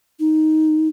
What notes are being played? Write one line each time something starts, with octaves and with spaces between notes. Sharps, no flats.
D#4